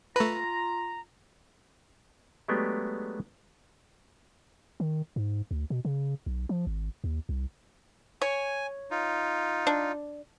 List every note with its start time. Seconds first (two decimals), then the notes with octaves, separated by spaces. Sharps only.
0.16 A3 F4 B4 A#5
2.48 F#3 G#3 A3 B3 D4 G4
4.80 D#3
5.16 G#2
5.51 D2
5.70 B2
5.85 C#3
6.26 B1
6.49 F3
6.67 G#1
7.04 D#2
7.29 C2
8.22 C#5 G#5
8.91 D#4 F4
9.67 D4